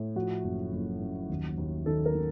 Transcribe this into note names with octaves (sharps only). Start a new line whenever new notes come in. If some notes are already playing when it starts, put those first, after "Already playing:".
Already playing: A2
F3 F#4
F#1
F#1
F#2
D#2
D#2
D#3 A4
A#4
D#3